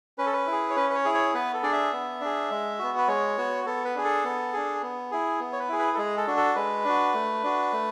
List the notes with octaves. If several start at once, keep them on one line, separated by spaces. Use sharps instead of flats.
C#4 B4
A4
B4
E4
G#4
C#5
C#4 B4
B4
C#5
E4 G#4
C#5
B3 B4
A4
D4 G#4 D5
E5
B3
D4 G#4
G#3
B3 F#4
B4
G#3 C#5
B3 F#4
B3 A4
B4
D4 G#4
A4
B3
D4 G#4
B3
E4 G#4
B3
C#5
B4
E4 G#4
B4
A4
G#3 G#4
A4
D4 F#4
A4
G#3 B4
D4 F#4
A3
D4 F#4
A3